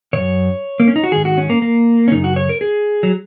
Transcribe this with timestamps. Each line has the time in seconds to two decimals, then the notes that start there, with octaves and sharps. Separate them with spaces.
0.13 F#2 C#3 C#5
0.80 A#3
0.88 C#4
0.96 D#4
1.04 F#4
1.12 G#2 D#3 G#4
1.25 F#4
1.38 C#4
1.50 A#3
1.62 A#3
2.08 C#4
2.11 F#2 C#3 D#4
2.24 F#4
2.36 C#5
2.49 A#4
2.61 G#4
3.03 F#3